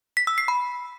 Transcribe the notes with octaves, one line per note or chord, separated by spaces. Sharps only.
B6
E6
C7
B5